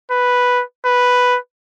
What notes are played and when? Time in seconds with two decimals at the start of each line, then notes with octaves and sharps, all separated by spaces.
0.11 B4
0.86 B4